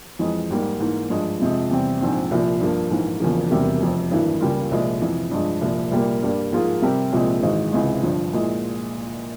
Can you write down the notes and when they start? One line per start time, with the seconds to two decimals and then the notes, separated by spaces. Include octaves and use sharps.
0.19 F2 E3 G#3
0.51 G#2 G3 A#3
0.80 G#2 E3 A#3
1.10 G2 F3 G#3
1.40 F2 C3 F3 G#3
1.71 E2 C3 G3 C4
2.01 A#1 G#2 F3 C4
2.31 C2 A#2 F3
2.61 G2 F3 A#3
2.91 A#1 G#2 E3 A#3
3.20 E1 E2 C#3 F3 A#3
3.50 E1 E2 C3 G3 A#3
3.82 F1 F2 C3
4.11 G#1 G2 E3 A#3 E4
4.41 C#2 C#3 G3 A#3 F4
4.71 C2 A#2 F3 G#3
5.02 F2 C3 E3
5.31 G2 F3 G#3
5.61 C2 A#2 F3
5.91 C2 A#2 G3 A#3
6.22 G2 G3 A#3
6.52 G#2 F3 A#3 F4 G#4
6.82 C3 G3 C4 G4 A#4
7.13 C2 A#2 F3 G#3 C4
7.42 G#1 G#2 E3 G#3
7.72 C#2 C3 E3 G#3
8.03 G1 G2 F3
8.33 A#2 G#3 E4